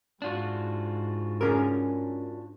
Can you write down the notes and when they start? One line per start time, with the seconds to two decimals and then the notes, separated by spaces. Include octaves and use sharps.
0.22 G#2 D4 F4 F#4
1.41 C#4 G#4 A#4